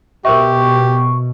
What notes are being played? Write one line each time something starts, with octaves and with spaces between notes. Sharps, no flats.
B2 G4 A#4 C5 E5 C#6